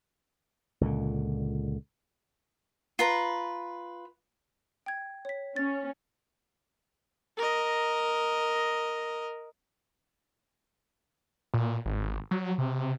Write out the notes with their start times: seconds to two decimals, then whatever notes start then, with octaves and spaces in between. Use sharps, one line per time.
0.81 C#2 A#2 D3
2.99 F4 B4 A#5
4.86 G5 G#6
5.25 C#5 B6
5.56 C#4 A6
7.37 A#4 D#5
11.54 A#2
11.86 G#1
12.31 F#3
12.58 C3